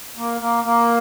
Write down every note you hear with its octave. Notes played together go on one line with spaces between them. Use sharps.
A#3
A#3
A#3